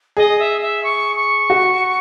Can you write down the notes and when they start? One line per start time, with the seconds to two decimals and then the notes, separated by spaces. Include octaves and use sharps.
0.17 G#4 D#5
0.39 E5
0.61 E5
0.83 C#6
1.16 C#6
1.50 F#4